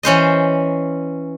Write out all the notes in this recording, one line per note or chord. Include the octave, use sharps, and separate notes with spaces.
E3 C#4 C5 D#5